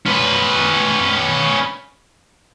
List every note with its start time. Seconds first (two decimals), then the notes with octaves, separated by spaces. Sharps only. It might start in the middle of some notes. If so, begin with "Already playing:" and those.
0.06 C#4 B4